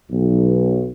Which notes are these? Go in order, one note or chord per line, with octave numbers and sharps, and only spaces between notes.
B1